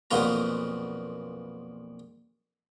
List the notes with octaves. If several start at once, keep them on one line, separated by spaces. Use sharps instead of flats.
B1 F2 A#2 B3 F4 A#5